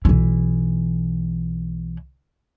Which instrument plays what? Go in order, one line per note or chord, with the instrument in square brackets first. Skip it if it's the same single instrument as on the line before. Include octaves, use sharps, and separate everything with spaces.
[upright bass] B1 E3